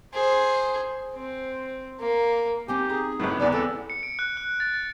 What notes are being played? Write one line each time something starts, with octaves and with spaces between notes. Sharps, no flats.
G#4 C5
C4
A#3
C4 D#4 G4 G#5 D6
G#4 A#5
G1 F#2 A2 B3
E2 E3 D5
C4 A4
C#7
D7
F#6
F#6
A6
A6